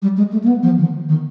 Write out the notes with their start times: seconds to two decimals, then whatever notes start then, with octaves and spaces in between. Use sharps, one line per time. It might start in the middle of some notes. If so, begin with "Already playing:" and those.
0.02 G3
0.17 G#3
0.32 A3
0.43 A#3
0.48 B3
0.63 F3
0.78 D#3
1.09 D#3